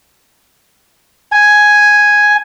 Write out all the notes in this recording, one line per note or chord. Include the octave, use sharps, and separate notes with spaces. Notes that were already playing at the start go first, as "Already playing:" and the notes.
G#5